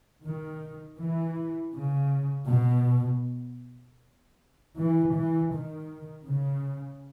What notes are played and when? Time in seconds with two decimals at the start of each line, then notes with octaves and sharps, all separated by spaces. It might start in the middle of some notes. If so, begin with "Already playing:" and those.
0.24 D#3
1.00 E3
1.75 C#3
2.50 B2
4.77 E3
5.15 E3
5.53 D#3
6.28 C#3